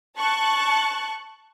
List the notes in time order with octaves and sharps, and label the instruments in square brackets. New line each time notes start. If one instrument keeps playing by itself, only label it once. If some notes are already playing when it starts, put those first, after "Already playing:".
[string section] A5 C#6 F#6